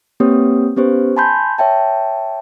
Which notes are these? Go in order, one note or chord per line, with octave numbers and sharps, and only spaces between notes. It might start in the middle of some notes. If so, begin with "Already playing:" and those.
A#3 C4 G4 B4 C#5 D#6
B3 C#4 G4 B4 C5
G#5 A5 B5 C6 G6
C#5 E5 G5 A5